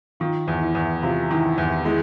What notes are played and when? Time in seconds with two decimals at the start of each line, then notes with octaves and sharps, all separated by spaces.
0.20 D#3 F4
0.48 E2
0.61 E4
0.75 E2
1.02 C3 F4
1.30 D#3 E4
1.58 E2
1.85 G#3 E4